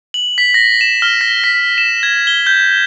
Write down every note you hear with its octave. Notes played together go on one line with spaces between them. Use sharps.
F#7
B6
A#6
E7
F6
A#6
B6
E7
G#6
G7
G6